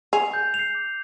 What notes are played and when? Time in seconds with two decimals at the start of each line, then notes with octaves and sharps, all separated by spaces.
0.13 G#4 C7 F7
0.34 G6
0.54 F7
0.59 C7
0.75 D6